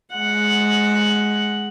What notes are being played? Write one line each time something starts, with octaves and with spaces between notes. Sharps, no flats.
G#3 F#5